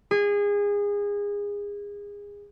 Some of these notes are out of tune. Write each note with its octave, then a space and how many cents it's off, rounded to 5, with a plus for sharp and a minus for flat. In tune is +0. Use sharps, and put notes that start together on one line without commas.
G#4 -25